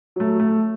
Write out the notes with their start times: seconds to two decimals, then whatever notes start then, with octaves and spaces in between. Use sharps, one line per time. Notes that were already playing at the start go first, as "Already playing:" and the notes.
0.16 F#3 A3
0.40 A3